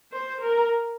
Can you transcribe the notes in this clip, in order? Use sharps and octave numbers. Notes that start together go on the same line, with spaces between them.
C5
A#4